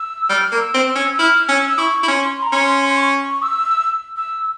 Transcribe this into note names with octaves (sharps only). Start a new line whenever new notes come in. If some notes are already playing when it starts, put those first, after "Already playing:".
Already playing: E6
G3 F6
A#3
E6
C4
E6
C#4
E6
E4 F6
C#4 E6
E6
E4 C#6
E4
C#4 C6
A#5
C#4 C6
C6
C#6
E6
E6